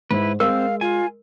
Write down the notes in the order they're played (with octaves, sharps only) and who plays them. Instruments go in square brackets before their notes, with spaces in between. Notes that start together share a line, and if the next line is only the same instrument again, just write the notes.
[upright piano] G#2 C5 [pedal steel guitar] E4 B4
[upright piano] G#3 [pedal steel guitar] C4 [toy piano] A#4 [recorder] F5
[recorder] F4 [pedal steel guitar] G#5